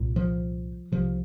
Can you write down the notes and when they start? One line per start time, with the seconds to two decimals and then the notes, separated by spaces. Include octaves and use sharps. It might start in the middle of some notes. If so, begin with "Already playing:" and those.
Already playing: C2 A#2
0.16 F3
0.92 C2 C3 F3